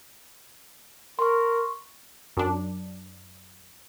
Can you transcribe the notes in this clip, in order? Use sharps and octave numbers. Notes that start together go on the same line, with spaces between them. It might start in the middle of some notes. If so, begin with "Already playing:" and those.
A#4 C6 C#6
F#2 D4